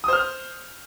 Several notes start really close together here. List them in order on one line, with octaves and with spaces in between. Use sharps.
D#6 C5 F6